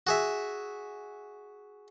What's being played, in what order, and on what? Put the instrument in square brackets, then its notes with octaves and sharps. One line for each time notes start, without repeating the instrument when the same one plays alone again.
[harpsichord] F#4 G#4 E5